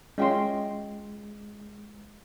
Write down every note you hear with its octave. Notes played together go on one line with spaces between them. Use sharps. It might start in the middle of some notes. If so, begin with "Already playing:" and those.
G#3 C#4 F4 D#5 E5 G5 C6